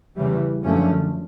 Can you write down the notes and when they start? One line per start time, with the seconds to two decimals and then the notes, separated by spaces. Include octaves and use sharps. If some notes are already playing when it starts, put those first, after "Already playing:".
0.16 E2 C#3 E3 G3
0.64 F#2 D3 F3 A3 C#4